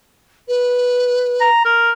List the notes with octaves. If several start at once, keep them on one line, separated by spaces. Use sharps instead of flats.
B4
A#5
A#4